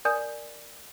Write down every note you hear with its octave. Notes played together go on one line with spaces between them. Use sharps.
A#4 D5 G#5 D#6 G6